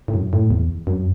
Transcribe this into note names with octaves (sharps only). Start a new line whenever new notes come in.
A2
F#2
A2
E2
F#2